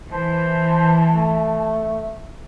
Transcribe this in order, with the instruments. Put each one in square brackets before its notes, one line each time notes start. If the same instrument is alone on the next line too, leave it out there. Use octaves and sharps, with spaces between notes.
[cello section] E3 [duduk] C5 [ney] A5
[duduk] A3